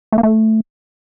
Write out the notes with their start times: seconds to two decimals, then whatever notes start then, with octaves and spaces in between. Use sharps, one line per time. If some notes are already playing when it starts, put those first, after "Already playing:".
0.12 A3
0.18 A#3
0.23 A3